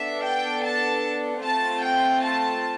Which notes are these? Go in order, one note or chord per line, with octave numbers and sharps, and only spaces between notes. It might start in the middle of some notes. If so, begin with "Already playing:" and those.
Already playing: B3 D4 A4 E5
G5
A5
A3 C4 F4 A5
G5
A5